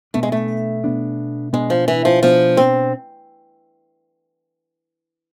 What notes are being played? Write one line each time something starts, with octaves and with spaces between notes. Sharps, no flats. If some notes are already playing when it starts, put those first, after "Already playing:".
B2 A3 B3 D4
G#3
A3
B2 B3 D4
B2 G#3 B3 D4
F3
E3
F3
B2 F3 B3 D4
C4